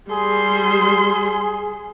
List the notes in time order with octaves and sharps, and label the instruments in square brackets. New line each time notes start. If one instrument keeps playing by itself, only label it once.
[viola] G3 C6 [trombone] G#4